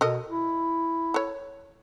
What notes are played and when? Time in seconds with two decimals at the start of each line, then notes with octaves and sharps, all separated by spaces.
0.01 B2 A4 A#4 D#5
0.28 E4
1.14 A4 C#5